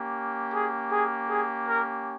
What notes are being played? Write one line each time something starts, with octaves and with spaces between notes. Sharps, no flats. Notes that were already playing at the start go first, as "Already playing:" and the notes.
Already playing: A#3 C#4 G4
G#4
G#4
G#4
A#4